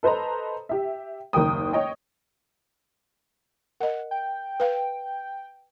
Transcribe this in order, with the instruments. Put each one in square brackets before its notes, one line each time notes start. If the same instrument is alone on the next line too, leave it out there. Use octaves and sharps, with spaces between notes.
[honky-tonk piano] A4 B4 C5 D#5 A#5
G4 E5
F#1 D#2 A#4 G5 D#6
C#5 D#5 G5
[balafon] A#4 D#5 [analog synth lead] F#5
[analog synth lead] G5
[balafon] B4 F5